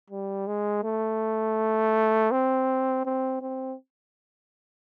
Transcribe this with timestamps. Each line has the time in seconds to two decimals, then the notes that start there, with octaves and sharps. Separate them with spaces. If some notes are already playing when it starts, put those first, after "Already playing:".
0.10 G3
0.47 G#3
0.84 A3
2.31 C4
3.06 C4
3.42 C4